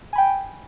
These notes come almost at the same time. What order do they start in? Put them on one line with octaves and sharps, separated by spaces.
G#5 B5 G5